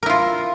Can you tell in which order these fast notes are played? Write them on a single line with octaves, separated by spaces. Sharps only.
A#4 E4 F4